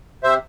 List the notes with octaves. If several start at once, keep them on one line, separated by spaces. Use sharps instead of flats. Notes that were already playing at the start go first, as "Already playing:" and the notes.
C3 C5 E5